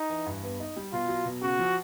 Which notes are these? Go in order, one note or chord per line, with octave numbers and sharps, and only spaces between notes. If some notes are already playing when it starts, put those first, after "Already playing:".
Already playing: D#4
E3
G2
B3
D#4
G3
B2 F4
F#3
B2
C#3 F#4
F3